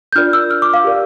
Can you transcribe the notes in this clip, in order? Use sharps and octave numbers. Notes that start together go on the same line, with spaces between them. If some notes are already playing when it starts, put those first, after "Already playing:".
G6
D4 F4 A#4 D5 F6
E6
F6
D6
F5
G4 A#4 D5